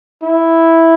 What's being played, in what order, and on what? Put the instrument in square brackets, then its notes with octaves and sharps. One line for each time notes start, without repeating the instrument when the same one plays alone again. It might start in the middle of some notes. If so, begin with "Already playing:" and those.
[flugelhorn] E4